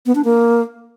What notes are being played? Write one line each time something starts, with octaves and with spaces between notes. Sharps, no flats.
B3
D4
A#3